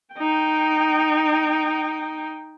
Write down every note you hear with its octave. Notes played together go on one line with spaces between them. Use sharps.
D#4 G5